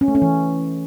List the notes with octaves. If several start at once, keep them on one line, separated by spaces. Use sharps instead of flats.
C#4
A3
C#4
E3